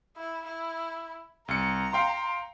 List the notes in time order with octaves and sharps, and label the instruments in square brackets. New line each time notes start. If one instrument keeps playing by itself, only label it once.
[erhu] E4
E4
[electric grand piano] C2 C#7 [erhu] A#5
[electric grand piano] F5 G5 C6